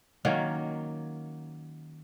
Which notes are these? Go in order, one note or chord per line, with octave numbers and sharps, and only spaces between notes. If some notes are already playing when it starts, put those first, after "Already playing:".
D#3 F#3 A#3 C#4